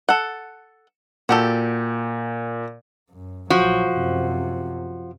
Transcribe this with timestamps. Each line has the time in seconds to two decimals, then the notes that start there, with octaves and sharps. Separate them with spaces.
0.09 A4 F#5
1.29 A#2 F#4 G4 A4
3.10 F#2
3.50 A#1 F3 F#3 F#4
3.88 F#2 C3